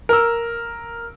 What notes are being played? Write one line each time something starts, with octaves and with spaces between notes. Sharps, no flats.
A#4 E6